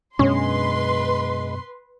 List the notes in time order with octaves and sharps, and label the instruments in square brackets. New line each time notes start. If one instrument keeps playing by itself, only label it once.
[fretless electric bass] F#2 B2 D4 [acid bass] G#3 [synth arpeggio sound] C#4 [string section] B4 C6